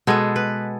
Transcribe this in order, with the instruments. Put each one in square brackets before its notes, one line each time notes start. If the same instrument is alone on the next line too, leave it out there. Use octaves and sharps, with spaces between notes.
[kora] B2 G#3 B3 A4
B4